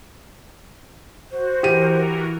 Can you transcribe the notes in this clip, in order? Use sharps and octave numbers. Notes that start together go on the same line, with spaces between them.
F#4 C5
E3 F#4 G4 A#4 D#7